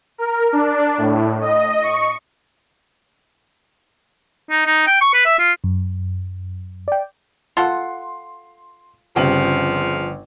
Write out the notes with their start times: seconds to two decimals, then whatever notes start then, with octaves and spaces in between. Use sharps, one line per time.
0.18 A#4
0.53 D4
0.98 A2
1.41 D#5
1.83 C#6
4.51 D#4
4.66 D#4
4.87 G5
5.01 C#6
5.14 B4
5.25 E5
5.39 F4
5.64 F#2
6.88 D5 G5
7.57 F4 A4 F#5 C6
9.16 G1 C#3 F3 C4 G4 G5 G#5 F#7